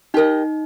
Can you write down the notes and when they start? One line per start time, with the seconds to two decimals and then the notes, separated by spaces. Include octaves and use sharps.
0.14 D#4 G4 A#4 D#5